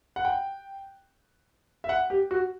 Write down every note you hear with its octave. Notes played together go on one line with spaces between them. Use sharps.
F#5
G5
E5
F#5
G4
F#4